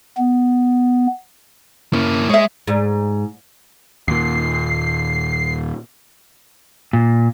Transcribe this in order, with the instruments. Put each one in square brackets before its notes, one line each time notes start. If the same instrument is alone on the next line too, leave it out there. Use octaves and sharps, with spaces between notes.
[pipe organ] B3
[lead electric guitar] A#3 E4 [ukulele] C#4
[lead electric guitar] G#3 [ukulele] C#5 E5
[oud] G#2
[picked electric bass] D#2 A#2 [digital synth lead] C7
[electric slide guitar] A#2